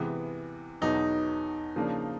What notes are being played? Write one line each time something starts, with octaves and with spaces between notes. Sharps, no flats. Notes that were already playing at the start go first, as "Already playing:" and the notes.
Already playing: C3 E3 G#3 B3
E2 B2 F#3 B3 D#4
C#3 F3 A#3 D4